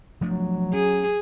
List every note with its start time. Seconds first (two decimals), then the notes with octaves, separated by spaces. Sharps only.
0.21 F3 F#3 A3 D4
0.74 C#4 G#4